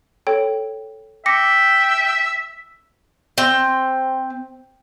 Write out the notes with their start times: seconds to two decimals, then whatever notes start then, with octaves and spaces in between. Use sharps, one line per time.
0.27 A4 C#5 G5
1.26 E5 G5 D6 A#6 C#7
3.38 C4 G5